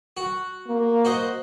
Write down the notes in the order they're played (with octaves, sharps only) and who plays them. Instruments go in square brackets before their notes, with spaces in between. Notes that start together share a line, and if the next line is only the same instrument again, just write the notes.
[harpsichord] F#4
[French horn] A#3
[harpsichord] F#4 C5 D#5